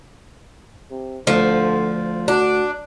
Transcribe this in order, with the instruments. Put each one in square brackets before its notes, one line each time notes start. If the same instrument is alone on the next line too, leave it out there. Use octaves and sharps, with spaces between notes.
[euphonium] C3
[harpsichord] D2 [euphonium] D3 [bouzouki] F3
[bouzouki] D4 [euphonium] F#4